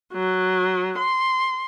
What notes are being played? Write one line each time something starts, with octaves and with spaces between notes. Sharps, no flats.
F#3
C6